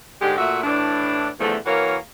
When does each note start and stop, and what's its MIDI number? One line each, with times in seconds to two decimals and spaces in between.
0.21 0.37 44
0.21 0.37 50
0.21 0.37 56
0.21 0.37 67
0.38 0.60 46
0.38 0.60 57
0.38 0.60 66
0.38 0.60 76
0.64 1.29 45
0.64 1.29 52
0.64 1.29 62
1.40 1.56 40
1.40 1.56 50
1.40 1.56 53
1.40 1.56 57
1.66 1.97 52
1.66 1.97 58
1.66 1.97 66
1.66 1.97 70
1.66 1.97 73